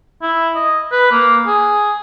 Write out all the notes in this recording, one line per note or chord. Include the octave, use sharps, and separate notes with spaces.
E4
D#5
B4
A#3
G#4